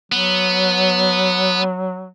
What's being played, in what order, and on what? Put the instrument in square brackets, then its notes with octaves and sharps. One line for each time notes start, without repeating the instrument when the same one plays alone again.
[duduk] F#3 [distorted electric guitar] B3